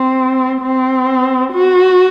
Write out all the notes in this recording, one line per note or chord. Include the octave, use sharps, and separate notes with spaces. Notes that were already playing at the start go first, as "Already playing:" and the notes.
Already playing: C4
C4
F#4